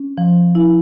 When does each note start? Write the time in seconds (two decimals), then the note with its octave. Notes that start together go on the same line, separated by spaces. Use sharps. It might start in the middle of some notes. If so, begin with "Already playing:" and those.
Already playing: C#4
0.18 F3
0.55 E4